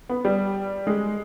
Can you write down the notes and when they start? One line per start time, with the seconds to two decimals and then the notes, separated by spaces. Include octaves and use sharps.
0.09 B3
0.25 G3
0.87 G#3